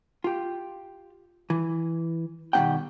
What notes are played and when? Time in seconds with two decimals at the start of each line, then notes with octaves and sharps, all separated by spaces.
0.24 F4 G4
1.50 E3
2.53 B2 D#3 G3 D4 F#5 G5